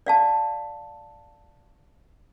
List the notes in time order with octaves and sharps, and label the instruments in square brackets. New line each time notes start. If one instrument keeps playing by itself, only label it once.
[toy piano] D5 F5 A5